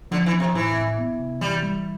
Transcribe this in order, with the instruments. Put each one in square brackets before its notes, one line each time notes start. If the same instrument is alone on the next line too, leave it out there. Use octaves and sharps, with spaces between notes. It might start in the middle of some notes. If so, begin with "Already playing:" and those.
[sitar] D3 [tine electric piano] F3
[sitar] E3
[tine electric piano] C4
[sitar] C3
[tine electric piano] A2 [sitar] E3
[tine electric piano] A2
B3
C3
[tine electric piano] E3 [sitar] G3
[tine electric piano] G3